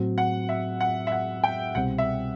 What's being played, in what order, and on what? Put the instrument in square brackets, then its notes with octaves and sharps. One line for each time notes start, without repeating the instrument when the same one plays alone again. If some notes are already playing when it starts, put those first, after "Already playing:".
Already playing: [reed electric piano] A2 F#3 C4 F#4
[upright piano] F#5
E5
F#5
E5
F#5
G5
[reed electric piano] C2 B2 G3 C4 [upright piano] F#5
[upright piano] E5